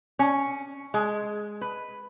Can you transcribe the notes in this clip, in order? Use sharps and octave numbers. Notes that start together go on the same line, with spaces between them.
C#4
G#3
B4